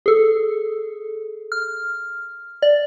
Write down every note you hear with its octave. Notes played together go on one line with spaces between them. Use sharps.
G#4 A4
F6
D5